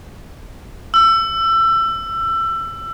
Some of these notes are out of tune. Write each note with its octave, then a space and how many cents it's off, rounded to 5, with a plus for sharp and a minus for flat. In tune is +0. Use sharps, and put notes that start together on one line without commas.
E6 +25